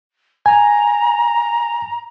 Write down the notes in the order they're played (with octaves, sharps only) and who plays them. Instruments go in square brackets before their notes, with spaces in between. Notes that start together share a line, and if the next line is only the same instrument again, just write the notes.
[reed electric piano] G#5 [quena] A#5